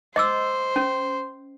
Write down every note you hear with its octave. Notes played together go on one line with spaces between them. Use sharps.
C5 D#5 D6 E6
C#4